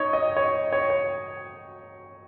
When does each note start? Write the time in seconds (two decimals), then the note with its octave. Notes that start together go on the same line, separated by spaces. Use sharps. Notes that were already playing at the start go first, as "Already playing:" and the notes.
Already playing: D#4 C#5
0.13 D#5
0.37 C#5
0.72 C#5
0.90 C#5